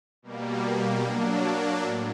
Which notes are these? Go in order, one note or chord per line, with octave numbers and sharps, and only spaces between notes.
B2 G3 A#3
F#3 A#3 D4
A2